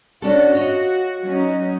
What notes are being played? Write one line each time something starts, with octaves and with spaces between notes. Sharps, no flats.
C#4 D4 F#4 A4
F4 C#5 D#5
F#3 C#4 D#4